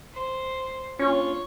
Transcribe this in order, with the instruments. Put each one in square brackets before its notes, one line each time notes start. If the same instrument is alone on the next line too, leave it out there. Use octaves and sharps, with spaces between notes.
[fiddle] C5
[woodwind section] A#3 D4 F4 [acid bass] C#4 [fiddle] C#5